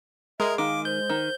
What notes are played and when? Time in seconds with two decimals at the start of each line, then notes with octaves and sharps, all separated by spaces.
0.40 G#3 A#4 E5
0.58 D#3 F5 D6
0.85 C5 G6
1.10 D#3